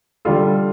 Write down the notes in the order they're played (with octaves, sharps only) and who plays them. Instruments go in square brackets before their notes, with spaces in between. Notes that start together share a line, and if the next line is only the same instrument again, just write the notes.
[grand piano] D3 G3 D4 F4 A4